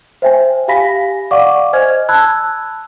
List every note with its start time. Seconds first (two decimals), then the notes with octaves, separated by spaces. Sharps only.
0.22 C5 E5 G5 G#5
0.68 G4 F5 G#5 B5 A#6 B6
1.31 D5 F5 F#5 C#6 D6
1.73 C5 D#5 G#5 F6 G#6
2.09 A5 B5 E6 F#6 G#6